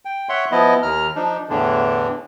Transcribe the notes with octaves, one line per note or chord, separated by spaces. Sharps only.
G5
C#5 E5 F#5 C6
F3 B3 E4 D#5
D#2 A#5 F6
F3 D4 D#4
E2 A2 D3 E3 D4